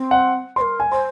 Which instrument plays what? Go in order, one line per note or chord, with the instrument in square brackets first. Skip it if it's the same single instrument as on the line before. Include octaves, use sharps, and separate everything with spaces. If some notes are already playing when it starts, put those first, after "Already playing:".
Already playing: [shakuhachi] C4
[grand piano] F#5
[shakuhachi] C5 [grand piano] C6
[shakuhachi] A#4
[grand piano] G#5
[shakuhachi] C5 [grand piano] C6